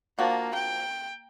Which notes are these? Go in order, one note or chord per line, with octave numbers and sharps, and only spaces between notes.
F3 A#3 D4 F#4
G5